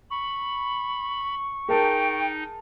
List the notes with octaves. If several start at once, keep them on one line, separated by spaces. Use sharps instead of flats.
B5 C#6
D#4 G#4 A#4 G5 A5